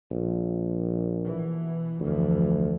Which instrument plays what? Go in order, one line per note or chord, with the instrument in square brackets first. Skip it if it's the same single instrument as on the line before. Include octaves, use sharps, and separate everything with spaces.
[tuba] A#1
[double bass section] B2 E3
[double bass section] F1 E3 F3 [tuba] D2